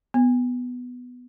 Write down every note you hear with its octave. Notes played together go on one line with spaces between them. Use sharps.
B3